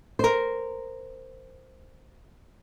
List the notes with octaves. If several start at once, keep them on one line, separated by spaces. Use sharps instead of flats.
A#4 C5